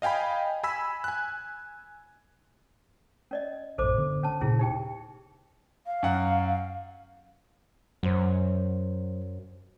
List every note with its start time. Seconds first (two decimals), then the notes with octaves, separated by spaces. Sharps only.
0.02 D#5 F5 G5 G#5 B5
0.63 G#5 B5 E6 B6
1.04 G#5 F#6
3.31 C#4 D5 D#5
3.78 A#1 F#2 A2 A4 C5 D6
3.98 D3 B3
4.23 C#4 A5
4.41 D#1 A#2 C#3 C#4 E4 G#4
4.59 D#4 G4 G5
5.86 F5
6.03 F#2 F#5
8.03 F#2 F#3 C5